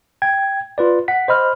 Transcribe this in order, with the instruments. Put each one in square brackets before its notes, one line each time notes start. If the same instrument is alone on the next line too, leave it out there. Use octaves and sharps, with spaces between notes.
[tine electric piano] G5 G#6
F4 B4 D5
F#5 B6
C5 D#5 B5 F6